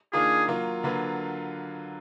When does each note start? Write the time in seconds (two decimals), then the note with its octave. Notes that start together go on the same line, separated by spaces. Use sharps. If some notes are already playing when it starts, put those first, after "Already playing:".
0.13 D#3 A#3 D4 F4 G#4
0.48 F#3 A#3 F4
0.83 D3 F#3 A#3 F4 B4